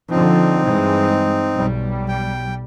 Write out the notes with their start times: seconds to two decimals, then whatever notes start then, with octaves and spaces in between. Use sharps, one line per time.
0.11 D3 F3 C4 D#4
0.65 G2 E3 G#3
1.56 B1 G3
2.08 G5